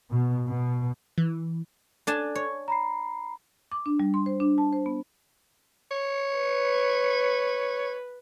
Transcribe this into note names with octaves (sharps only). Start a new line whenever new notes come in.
B2
B2
E3
D4 A4 G#5 A5
C#5
A#5 B5 C7
D6
D4
G3
C6
C5
D4
A5
C5
B3
C#5
B4